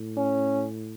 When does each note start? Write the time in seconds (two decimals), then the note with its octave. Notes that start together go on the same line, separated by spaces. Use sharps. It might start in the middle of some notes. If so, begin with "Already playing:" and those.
Already playing: A2
0.17 C#4